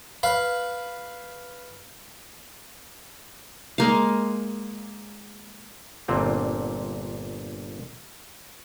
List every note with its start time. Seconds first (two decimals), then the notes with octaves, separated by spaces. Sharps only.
0.23 B4 F5
3.78 G#3 A#3 F5
6.08 G1 A#2 D3 C4